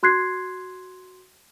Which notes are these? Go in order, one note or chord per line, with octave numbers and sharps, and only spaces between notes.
F#4 C6 F#6 G#6 C7